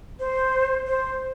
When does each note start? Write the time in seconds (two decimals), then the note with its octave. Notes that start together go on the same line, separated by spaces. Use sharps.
0.19 C5
0.87 C5